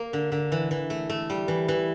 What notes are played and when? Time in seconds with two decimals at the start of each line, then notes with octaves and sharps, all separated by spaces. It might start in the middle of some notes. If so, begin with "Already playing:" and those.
Already playing: A#3
0.13 D3
0.32 D3
0.52 E3
0.71 E3
0.90 A3
1.10 A3
1.30 G3
1.48 E3
1.68 E3